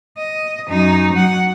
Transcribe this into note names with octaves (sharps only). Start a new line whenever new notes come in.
D#5
F#2 D#4
F#3 F#5